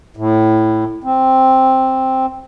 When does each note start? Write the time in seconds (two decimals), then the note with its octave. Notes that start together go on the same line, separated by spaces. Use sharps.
0.17 A2
1.04 C4